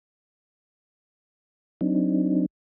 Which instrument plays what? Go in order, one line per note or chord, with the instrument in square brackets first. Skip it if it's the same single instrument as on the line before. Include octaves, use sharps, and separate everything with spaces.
[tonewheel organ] F#3 C4 D4 D#4